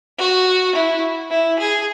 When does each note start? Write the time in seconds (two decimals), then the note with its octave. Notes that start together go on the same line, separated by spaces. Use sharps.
0.18 F#4
0.75 E4
1.31 E4
1.59 G#4